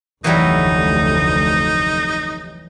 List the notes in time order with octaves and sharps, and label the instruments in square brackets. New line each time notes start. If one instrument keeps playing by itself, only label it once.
[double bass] F1 D2 [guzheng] E3 F#3 G3 [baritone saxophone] D#4